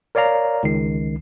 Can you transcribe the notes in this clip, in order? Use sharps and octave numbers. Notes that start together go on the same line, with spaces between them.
A#4 C#5 D5 F5 A#5
C#2 D#3 C7